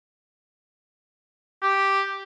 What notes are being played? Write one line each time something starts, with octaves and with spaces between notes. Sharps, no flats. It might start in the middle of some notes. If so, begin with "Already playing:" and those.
G4